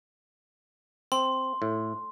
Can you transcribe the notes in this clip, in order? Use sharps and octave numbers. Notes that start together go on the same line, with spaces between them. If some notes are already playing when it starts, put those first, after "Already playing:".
C4 C6
A2